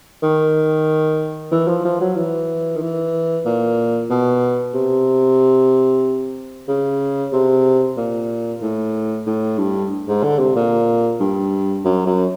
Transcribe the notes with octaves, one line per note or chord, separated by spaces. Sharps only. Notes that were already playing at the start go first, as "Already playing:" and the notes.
D#3
E3
F3
F3
F#3
E3
D#3
E3
A#2
B2
C3
C#3
C3
A#2
A2
A2
G2
G#2
D3
C3
A#2
G2
F#2
F#2